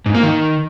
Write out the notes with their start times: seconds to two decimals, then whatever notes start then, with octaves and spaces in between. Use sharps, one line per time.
0.06 G#2
0.14 A#3
0.23 D#3